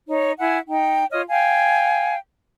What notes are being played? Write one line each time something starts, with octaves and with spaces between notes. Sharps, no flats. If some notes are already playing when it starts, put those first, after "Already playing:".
D#4 C#5
E4 F#5 G#5
D#4 G5
F4 C#5 D#5 F6
F5 G5 G#5